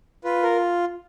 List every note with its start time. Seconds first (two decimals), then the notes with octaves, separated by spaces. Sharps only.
0.24 F4 B4
0.43 A#4